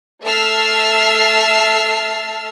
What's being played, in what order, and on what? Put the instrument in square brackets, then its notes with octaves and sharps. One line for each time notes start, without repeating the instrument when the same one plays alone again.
[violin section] A3 E5 A5 E6 F6 C7